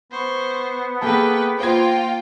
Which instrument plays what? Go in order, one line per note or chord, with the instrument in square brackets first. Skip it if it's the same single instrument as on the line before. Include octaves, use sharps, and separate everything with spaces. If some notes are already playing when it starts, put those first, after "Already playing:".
[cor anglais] B3 [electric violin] C5 C#6
[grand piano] A#3 G#4 A4 [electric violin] B4 G5
[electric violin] A#3 [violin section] F4 G5 [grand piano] C5 G#6